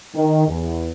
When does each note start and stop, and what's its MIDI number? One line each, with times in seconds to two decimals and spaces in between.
0.16 0.47 51
0.49 0.91 40